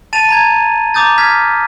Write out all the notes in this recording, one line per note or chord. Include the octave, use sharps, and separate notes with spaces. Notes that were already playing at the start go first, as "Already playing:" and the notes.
A5 A6 D#7 F7
A#5 G#6
A#5 D6 D#6 G6 A6
F6 G#6 B6